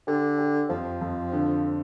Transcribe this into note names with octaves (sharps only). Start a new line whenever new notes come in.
D3 G4
G4
F2 F3
F2
D3